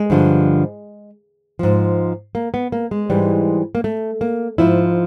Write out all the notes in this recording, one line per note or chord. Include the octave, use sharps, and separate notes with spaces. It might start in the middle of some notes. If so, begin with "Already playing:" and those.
Already playing: G#3
G2 D3 F3
G#2 F3
A#3
B3
A#3
G#3
G#2 E3 G3
A#3
A3
A#3
G#2 F3 E4